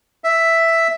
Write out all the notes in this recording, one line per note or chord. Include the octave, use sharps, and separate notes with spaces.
E5